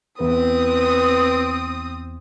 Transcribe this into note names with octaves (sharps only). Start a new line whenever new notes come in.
E2 C4 B4 D#6